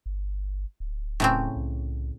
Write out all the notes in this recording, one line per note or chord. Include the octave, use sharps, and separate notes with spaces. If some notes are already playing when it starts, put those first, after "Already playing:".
G1
D1
A2 C#3 C4
C2